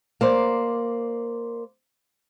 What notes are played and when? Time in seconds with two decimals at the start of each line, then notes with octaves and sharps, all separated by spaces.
0.21 A#3 C5 D5